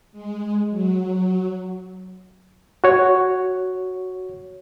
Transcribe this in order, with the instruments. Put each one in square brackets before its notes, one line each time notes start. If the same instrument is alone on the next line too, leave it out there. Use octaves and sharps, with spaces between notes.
[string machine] G#3
F#3
[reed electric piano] F#4 C#5